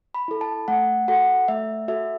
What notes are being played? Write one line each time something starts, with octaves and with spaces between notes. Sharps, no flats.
B5
E4 A4
A5
A3 F#5
F#4 A4 F#5
A3 E5
F#4 A4 E5